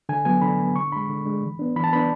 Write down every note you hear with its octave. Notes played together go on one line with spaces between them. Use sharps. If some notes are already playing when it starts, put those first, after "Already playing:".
D3 G#5
F#3 B3 G#5
D3 B5
F#3 B3
D3 C#6
G#3 D4 B5
D3
G#3 D4
E3
B3 D4
E3 B5
A5
B3 D4 B5